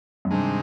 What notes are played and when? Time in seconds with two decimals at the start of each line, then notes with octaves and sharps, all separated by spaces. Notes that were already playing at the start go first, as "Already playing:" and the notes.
0.25 F#2
0.31 G2 C3 D#3 G#3